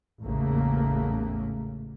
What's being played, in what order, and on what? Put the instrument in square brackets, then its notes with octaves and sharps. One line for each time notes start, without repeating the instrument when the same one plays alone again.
[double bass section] A1 E2 G#2 C#3 A3 A#3